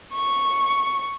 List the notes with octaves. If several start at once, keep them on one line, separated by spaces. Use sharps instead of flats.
C#6